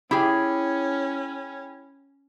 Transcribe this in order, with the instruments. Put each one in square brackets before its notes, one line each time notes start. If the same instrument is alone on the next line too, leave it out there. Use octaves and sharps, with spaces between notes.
[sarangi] C#4 [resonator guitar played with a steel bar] E4 G4 G#4 [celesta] G5 B5